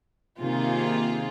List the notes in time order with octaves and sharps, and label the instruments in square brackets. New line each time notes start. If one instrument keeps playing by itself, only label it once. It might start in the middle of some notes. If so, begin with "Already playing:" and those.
[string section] C3 D#3 A#3 F4 G#4